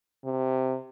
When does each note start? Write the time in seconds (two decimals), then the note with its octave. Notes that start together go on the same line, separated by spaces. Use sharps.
0.24 C3